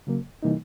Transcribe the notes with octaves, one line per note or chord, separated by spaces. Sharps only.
C#3 F#3 A#3
C3 E3 G3 A#3 D#4